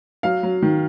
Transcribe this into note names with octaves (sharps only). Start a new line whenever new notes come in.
F#3 F5
F#3
D#3